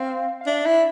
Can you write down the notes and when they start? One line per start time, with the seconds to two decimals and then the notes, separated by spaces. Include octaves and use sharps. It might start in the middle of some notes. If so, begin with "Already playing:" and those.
Already playing: C4 F5
0.41 F5
0.47 D4 E5
0.66 E4